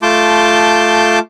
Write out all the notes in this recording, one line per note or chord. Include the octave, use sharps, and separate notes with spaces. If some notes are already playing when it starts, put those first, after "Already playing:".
A3 F4 A5 C6 D6 G6